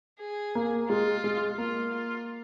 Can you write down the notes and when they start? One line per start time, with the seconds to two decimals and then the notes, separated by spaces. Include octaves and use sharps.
0.20 G#4
0.55 A#3
0.90 G#3 F4
1.24 G#3
1.58 A#3 F4
1.93 F4